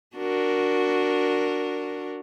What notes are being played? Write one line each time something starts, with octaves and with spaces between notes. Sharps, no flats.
D4 F#4 A#4